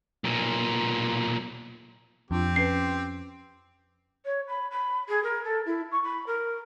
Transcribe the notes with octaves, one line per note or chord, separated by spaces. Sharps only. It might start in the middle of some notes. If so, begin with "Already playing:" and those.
B1 A#2
F2 C4 D4 F4 G4
C#4 B4 C7
C#5
B5
B5
G#4
A#4
A4
E4
C#6
B5
A#4